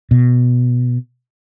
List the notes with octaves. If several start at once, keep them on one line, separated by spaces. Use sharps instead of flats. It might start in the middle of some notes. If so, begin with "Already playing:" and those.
B2